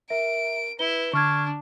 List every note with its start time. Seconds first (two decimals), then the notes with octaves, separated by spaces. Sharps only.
0.10 A#4 E5 D7
0.79 E4 B4 G7
1.13 D3 D4 C#6 F6 G#6